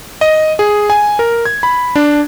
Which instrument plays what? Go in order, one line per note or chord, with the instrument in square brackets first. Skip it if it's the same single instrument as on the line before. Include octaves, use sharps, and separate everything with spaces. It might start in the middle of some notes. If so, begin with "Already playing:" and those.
[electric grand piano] D#5
G#4
G#5
A#4
G#6
B5
D4